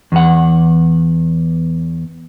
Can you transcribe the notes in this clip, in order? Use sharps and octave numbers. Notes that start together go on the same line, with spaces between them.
E2 F#5